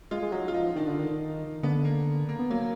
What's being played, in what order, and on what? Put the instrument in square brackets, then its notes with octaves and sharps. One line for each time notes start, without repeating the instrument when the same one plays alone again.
[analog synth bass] G#3 [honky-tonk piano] F4
[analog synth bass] G#3
[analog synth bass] F#3 [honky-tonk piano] D#4
[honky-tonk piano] F4
[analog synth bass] F3 [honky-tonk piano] D#4
[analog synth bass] D#3 [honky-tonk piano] D4
[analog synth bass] D3
D#3
[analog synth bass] D3 [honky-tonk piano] B3
[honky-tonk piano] A#3
A#3
[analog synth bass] B3
[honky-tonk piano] F#3 [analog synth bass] A#3